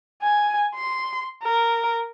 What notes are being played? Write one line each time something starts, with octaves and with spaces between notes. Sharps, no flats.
G#5
C6
A#4